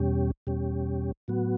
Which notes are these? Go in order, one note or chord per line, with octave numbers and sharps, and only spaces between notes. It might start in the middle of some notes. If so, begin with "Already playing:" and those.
Already playing: E2 B2 G3 C#4 G4
E2 B2 G3 C#4 G4
A2 F#3 B3 F#4